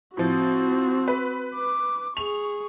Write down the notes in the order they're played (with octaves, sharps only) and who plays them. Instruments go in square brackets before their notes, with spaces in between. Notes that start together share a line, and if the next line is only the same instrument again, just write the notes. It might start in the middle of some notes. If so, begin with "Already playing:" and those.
[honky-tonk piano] A2 F3 [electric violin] C4 F#4
[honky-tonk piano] B4
[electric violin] D6
[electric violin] G#4 C#6 [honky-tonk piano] F7